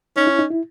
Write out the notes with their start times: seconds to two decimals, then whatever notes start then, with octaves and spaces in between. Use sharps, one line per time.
0.16 C#4 D#4
0.27 E4
0.39 D#4
0.51 E4